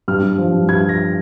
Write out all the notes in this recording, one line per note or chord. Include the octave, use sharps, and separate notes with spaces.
G2 F6
G2
F3
G2
G2 G#6
F3 A#6